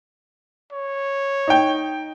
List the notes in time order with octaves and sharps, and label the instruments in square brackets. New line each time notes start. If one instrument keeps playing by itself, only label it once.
[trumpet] C#5
[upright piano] D#4 G5